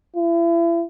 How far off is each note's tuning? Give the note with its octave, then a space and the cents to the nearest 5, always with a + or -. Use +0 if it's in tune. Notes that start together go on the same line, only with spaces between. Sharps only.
E4 +40